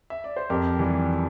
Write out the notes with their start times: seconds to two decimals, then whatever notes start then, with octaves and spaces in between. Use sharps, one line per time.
0.10 E5
0.24 D5
0.36 C5
0.50 F2 G4 A#4
0.79 E3 G3